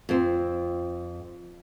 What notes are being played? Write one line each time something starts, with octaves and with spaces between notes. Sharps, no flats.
F2 C4